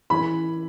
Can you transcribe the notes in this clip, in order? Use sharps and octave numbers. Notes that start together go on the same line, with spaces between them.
E3 B5